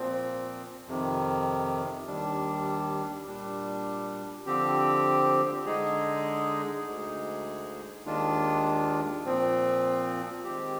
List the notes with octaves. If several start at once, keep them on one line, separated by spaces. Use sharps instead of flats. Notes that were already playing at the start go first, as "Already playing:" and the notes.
Already playing: A#2 F3 C4
F2 C3 D#3
D#2 D#3 G3 D4
A#2 G3 D4
D3 F3 C4 G4
D3 G#3 D#4 G#4
D2 D3 G#3 D#4 G#4
D#2 D#3 G#3 D4 F4
A#2 F3 C4
D#3 G#3 C4 G4